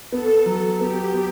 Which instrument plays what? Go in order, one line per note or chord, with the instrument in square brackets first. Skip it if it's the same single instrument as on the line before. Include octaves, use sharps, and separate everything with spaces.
[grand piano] B3 [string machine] A4
[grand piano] F#3
[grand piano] B3 [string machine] G4
[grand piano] B3